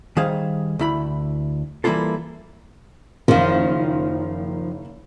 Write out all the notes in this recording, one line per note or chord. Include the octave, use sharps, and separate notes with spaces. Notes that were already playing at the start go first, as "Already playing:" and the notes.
D#3 G3 G#4 C5 F5
D2 E4 B5
E3 G3 A#3 E4 F4 A4
F#1 D#3 F3 F5